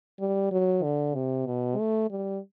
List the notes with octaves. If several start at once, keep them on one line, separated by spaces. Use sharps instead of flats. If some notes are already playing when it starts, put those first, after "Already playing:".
G3
F#3
D3
C3
B2
A3
G3